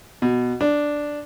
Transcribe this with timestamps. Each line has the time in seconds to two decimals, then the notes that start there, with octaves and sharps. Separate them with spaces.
0.22 B2
0.61 D4